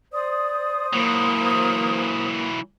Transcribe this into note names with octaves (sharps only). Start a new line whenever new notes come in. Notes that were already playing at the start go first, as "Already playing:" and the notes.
C5 D5 D#6
E3 F#3 A#3